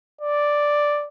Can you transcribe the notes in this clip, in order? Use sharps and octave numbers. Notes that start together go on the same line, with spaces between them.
D5